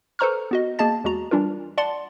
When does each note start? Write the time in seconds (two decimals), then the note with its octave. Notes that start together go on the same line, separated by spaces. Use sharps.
0.19 A4 B4 C5 A#5 C#6 F6
0.51 B3 F#4 D#5
0.79 A#3 G#4 D#5 A5 A6
1.04 E2 G#3 F#4 A#5
1.31 E3 G3 D4 F4 A#4
1.78 D5 F#5 A5 C6